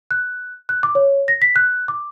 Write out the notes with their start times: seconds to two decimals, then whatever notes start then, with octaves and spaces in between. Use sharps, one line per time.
0.11 F#6
0.69 F#6
0.83 D6
0.95 C#5
1.28 A#6
1.42 B6
1.56 F#6
1.88 D6